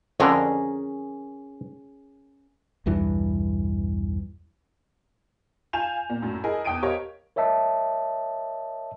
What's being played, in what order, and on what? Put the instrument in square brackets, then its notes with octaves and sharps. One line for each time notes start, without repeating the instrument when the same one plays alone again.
[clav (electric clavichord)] F2 D3 [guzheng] C#4 G#4 A#4
[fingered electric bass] B1 E2 G2 E3
[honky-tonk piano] F4 F5 G#5 G6 E7 F7
A#2
F#2 A2
E4 G#4 A#4 D#5
E2 G5 D#6 D7 D#7
G4 A#4 C#5 D#5 F5
[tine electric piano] A#4 C#5 D#5 E5 A5